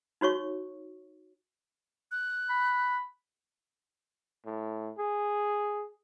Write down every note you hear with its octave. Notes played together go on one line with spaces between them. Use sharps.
D#4 F#4 C#5 C#6
F#6
B5
A2
G#4